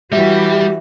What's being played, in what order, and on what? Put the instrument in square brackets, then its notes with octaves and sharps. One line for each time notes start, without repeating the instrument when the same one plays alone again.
[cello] E3 F#4 [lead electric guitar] G3 [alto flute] G4 [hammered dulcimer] E5